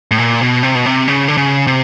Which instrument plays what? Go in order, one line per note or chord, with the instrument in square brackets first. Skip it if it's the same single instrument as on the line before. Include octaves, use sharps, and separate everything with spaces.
[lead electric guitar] A2
A#2
B2
C3
B2
C3
C#3
D3
C#3
C3